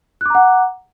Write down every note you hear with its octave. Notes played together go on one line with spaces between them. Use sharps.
F#5 A#5 D6 F#6